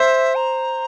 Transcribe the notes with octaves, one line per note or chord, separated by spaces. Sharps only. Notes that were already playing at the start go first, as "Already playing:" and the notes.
Already playing: C5 E5
A#5